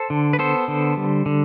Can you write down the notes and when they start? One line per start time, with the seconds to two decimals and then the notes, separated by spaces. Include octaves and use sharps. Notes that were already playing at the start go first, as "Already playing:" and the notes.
Already playing: A4 C5
0.10 D3
0.33 B4
0.39 B3 A4 C5
0.68 D3
0.97 G3
1.26 D3